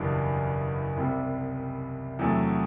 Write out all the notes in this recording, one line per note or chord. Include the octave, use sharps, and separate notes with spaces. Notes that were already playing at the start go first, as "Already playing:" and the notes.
Already playing: F#1 E2 B2 G3 D4
C2 C3 G3
E2 C3 F#3 A3